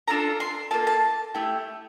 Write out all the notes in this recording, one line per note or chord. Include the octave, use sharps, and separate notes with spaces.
D4 F4 A4 A#5
C6
A#3 F4 A4 A5
A5
A3 E4 G4